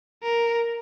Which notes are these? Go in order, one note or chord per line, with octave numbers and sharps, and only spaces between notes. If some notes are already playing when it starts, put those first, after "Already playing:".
A#4